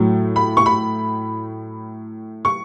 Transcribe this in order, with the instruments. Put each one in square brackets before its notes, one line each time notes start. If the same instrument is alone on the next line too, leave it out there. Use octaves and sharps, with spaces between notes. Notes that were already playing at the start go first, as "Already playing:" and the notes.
Already playing: [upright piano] A2 F#3 A3
B5
C#6
B5
C#6